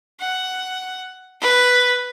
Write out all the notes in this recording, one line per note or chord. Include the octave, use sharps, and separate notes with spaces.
F#5
B4